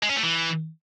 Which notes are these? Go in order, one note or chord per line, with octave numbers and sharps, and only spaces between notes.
G#3
C#4
A3
E3